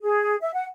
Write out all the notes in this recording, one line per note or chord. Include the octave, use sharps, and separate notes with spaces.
G#4
E5
F#5